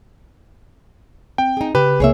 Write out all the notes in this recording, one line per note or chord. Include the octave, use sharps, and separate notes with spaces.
C4 G5
D#4 G#4
C#3 G4 B4
C2 A#3 G#4 C#5 E5